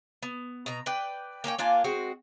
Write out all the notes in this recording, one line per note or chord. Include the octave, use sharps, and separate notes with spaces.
B3
B2 A#5
B4 D5 G5
A#3 C#4 C#5 G5
A#3 D4 F4 G#5
G#3 C4 F#4